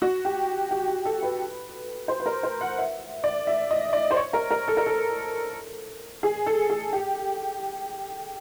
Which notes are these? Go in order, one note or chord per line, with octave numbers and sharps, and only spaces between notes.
F#4
G4
G4
G4
A4
B4
C5
B4
A#4
C5
F#5
E5
D5
E5
D#5
D5
C5
C#5
A#4
A#4
A4
A#4
A4
G#4
A4
G#4
G4